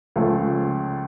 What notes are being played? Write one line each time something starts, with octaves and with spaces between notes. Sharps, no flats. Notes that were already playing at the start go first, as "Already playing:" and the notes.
C#2 C#3 F3 A3